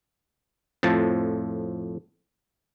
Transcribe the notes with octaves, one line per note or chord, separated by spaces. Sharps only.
F2 A2 F3 A5